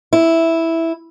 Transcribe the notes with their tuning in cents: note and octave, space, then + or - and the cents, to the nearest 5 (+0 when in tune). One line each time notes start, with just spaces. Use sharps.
E4 -5